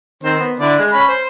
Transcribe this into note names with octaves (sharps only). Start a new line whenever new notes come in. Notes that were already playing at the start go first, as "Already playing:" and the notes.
D#3 C4 C5
B3
D3 E4 D5
G#3
C#4 B5
C5